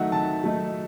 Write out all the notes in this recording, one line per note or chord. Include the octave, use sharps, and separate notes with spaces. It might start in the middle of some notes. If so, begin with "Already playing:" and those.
Already playing: D#3 F#3 A3 D#4 E5 F#5
D#3 A5
F#3 A3 D#4